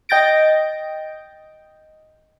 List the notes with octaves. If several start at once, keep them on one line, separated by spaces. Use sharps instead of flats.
D#5 G5 G6 A6 A#6 D7